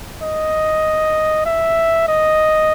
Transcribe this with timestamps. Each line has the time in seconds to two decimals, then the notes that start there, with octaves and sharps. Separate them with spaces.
0.22 D#5
1.46 E5
2.08 D#5